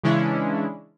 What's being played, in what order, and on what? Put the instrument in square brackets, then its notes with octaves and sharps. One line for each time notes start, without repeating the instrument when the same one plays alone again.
[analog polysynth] C#3 E3 G#3 C#4 D4 E4